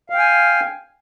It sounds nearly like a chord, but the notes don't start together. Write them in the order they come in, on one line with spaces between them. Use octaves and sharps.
F5 G5 G#5